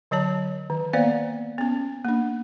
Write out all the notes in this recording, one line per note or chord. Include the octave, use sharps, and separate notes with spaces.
D3 F#3 C#5 A5
D#3
A#3 B3 C5 D5 F5
B3 C#4
A#3 D4